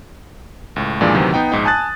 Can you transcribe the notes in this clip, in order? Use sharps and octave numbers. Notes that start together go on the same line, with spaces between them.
C#2 A2
G2 A#2 E3 F3 G#3 D4
D2 C3 D#3 E3 F#3
B3 D#4 G5
A#1 G#2 D#4
G#5 A5 D#6 F#6 A6